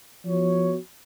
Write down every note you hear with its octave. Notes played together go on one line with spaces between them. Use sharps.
F3 B3 F#4 C#5